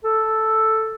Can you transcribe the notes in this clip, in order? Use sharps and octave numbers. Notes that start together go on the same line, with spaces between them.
A4